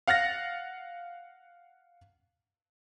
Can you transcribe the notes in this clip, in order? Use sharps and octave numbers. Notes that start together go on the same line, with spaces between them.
F5 F#5 F6 A6 A#6